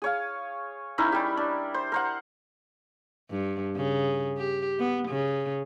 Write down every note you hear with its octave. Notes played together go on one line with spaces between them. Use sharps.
G#4 C#5 F5
C#4 D#4 E4 A#4
G3 G4
D4
C5
A#4 C5 F#5
G2
C#3
G4
B3
C#3